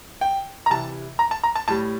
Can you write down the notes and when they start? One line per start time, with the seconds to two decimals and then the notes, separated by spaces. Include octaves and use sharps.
0.21 G5
0.66 A#5
0.70 C3 E3 G3 A5
1.19 A#5
1.31 A5
1.44 A#5
1.55 A5
1.68 A2 G3 A5